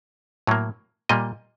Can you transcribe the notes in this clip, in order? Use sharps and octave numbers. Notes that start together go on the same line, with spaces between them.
A2 F#3 A#3
A#2 G3 A#3 D#5